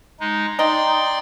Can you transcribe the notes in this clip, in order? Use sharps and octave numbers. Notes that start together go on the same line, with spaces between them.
G#3 D#4
D#4 D5 G5 C6